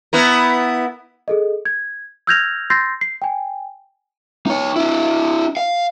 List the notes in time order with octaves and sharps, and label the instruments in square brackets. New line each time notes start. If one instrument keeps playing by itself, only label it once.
[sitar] B3 E4 A#4
[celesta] G#4 A4 D#5
G#6
E6 F6 G6 G#6 A#6 F7
C6 E6 G6 A6 A#6 C7
C7
G5 G#5
[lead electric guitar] D#4 C#5
D4 E4
F5